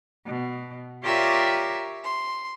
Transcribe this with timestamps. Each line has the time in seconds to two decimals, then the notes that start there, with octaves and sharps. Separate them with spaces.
0.25 B2
1.03 F4 G4 A#4 C#5 D5 E5
2.04 C6